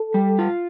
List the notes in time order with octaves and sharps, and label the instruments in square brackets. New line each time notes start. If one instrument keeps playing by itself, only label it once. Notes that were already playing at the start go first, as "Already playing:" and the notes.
Already playing: [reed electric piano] A4
[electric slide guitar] G3
F4